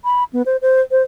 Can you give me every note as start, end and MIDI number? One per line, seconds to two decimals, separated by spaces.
0.04 0.24 83
0.33 0.42 59
0.46 0.57 72
0.62 0.81 72
0.91 1.02 72